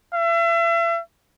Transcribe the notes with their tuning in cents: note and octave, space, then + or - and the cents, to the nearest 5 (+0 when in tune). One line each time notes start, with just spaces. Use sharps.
E5 +40